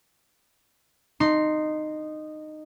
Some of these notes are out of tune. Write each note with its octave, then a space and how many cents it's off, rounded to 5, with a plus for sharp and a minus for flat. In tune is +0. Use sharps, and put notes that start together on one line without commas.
D#4 -15 C6 +0